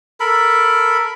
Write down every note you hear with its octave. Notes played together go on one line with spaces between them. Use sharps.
A4 A#4 B5